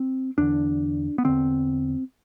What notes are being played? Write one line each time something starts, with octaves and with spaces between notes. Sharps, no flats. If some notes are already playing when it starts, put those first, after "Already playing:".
Already playing: C4
E2 D3 D4
B3
E2 D3 C4